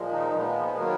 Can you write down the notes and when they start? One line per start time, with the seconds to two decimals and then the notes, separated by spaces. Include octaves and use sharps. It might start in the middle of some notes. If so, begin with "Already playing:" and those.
Already playing: A#2 F3 G#3
0.12 D#3 D#4
0.34 A#2 F3 G#3 B3
0.77 D#3 F#3 A#3